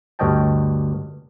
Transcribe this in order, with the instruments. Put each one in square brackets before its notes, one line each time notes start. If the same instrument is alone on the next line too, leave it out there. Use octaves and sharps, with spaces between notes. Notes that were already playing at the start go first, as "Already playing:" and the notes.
[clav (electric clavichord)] D2 G2 C#5 D#5 G5 A5